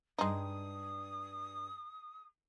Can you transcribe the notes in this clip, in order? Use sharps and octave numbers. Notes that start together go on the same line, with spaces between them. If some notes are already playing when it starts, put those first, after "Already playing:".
G2 G#3 D4 D#4 D#6